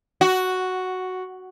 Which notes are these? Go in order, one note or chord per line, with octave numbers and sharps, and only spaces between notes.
F#4